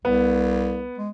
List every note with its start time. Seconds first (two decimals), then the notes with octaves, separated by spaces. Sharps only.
0.05 C2 B3
0.98 G#3